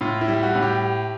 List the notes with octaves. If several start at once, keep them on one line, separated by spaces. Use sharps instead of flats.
A2 F4
E4
G3
F#4
A2
G4